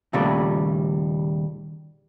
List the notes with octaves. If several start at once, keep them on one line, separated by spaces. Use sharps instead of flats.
D#2 A#2 C#3 G3 A3 D5